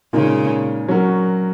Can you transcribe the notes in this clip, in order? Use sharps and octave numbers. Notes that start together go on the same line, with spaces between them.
A#2 C#3 G#3 D#4 A#4
F#3 C#4 F#4 A#4